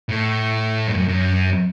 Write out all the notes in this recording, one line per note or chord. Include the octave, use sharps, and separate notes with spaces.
A2
G2
F#2
F#2